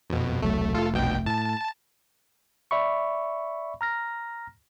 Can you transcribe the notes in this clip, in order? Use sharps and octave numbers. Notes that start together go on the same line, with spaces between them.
F2 B2
E1 C2 F#3 A3
F1 A3 F4 A4
B1 B2 G5
A2 A5
D5 E5 B5 C#6
A#5 F6 A#6